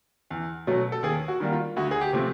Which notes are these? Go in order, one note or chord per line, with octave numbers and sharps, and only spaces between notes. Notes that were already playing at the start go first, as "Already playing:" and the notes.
E2
B2 F#3 A3 C#4
A4
D#2 G#4
F#4
D#3 G3 A#3
F4
D2 F#4
G#4
G4
C3 F3 A3 C4